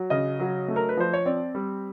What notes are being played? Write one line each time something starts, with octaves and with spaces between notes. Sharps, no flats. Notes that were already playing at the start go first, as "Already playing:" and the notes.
Already playing: F#3
C#3 D#5
F#3
A3
A#4
B4
F3 C5
C#5
C4 D5
G3